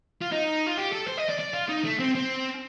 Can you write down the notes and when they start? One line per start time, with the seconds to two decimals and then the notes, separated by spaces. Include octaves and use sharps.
0.21 F4
0.32 D#4
0.66 F4
0.77 G4
0.92 A4
1.07 C5
1.17 D#5
1.29 D5
1.39 D5
1.54 F4
1.69 D#4
1.84 A3
1.99 C4
2.15 C4